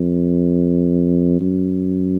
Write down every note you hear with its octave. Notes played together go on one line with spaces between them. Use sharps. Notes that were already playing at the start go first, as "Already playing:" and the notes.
Already playing: F2
F#2